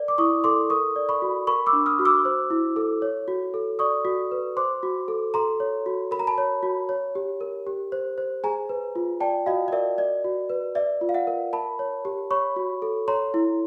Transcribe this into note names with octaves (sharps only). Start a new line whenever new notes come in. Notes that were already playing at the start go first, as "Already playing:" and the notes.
Already playing: A#4 D5
D6
E4 C#6 D#6
A4 C6 D6
A#4 C#6 D#6
D5
B5 C#6
F#4
A#4 B5 C#6
D6 E6
D4
D#6 F6
F#4
D6 E6
C5
E4
A4
C#5
F#4
A4
D5 C#6 D#6
F#4
B4
C5 C6 D6
F#4
A4
A4 A#5 C6
C#5
F#4
A#4 B5
A#5
A5 B5
C#5
F#4
C#5
G4
A#4
G4
C5
C5
G#4 G#5 A#5
B4
F4
D5 G5 A5
F#4 D#5 F5
D#5
A#4 D5 E5
D5 D#5
F#4
B4
D5 E5
F4
F5
E5 F#5
A#4
A#4 A5 B5
C#5
G4
C#5 B5 C#6
F#4
A4
C#5 A#5 C6
E4